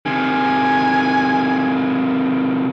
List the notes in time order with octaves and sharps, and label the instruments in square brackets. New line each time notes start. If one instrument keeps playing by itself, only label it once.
[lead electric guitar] C3 D#3 [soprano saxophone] G#5